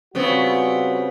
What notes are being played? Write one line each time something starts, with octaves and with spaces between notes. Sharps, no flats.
C#3 G3 B3 C4 F4 F#4